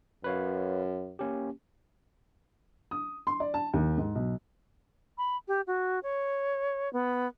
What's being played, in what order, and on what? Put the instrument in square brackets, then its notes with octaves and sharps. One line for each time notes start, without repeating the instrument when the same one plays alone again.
[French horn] F#2 [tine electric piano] B4 C#5 F5
[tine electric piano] A#3 C#4 G4
[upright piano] D#6
C6
D5
A5
D#2
G#2
B1
[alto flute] B5
G4
F#4
C#5
B3